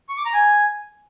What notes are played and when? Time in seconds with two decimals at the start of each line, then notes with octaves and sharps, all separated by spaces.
0.09 C#6
0.17 D6
0.25 A#5
0.34 G#5